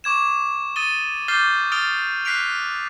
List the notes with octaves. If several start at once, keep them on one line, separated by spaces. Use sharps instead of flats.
C#6 D6 G#6 E7
D#6 A6 D#7 G7
D6 F6 G6 A6 C7 G7
D#6 F6 A6 D7 F7 G7
F#6 B6 C7 D7 F7